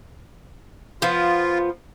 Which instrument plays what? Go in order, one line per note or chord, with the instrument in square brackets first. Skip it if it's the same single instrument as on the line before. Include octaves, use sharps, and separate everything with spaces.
[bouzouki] F3 B3 [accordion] F4